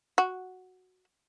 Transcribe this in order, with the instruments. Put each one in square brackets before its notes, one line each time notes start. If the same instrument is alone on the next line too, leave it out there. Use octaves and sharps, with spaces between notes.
[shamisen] F#4